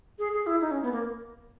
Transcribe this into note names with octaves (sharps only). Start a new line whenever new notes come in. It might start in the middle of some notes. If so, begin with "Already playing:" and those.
G#4
G#4
E4
D#4
C#4
B3
A#3